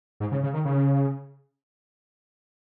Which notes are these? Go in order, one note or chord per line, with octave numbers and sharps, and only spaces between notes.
G#2
C#3
C#3
D#3
C#3